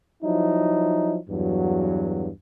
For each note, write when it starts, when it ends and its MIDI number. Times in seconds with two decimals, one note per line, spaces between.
0.23 1.18 53
0.23 1.18 54
0.23 1.18 63
0.23 1.18 64
1.29 2.29 40
1.29 2.29 43
1.29 2.29 54